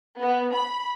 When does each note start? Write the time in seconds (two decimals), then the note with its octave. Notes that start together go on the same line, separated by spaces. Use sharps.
0.19 B3
0.55 B5